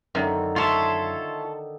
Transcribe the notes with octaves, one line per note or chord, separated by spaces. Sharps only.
F#2 D3 D#3
F4 A4 C#5 E5 C6